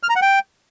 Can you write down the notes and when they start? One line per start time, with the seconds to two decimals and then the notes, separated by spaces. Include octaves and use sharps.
0.03 F6
0.09 A#5
0.16 F#5
0.22 G5